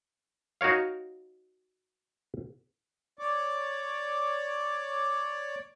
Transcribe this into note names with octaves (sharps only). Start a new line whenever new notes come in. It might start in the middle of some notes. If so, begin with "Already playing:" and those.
D#4 F#4 A#4 C#5 F5
C#5 D5 D6